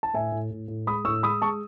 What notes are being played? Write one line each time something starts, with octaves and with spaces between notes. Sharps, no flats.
A5
A2 E5 G#5
A2
A2
A2
G#3 B5 D#6
A2 C#6 E6
G#3 B5 D#6
G#3 A5 C#6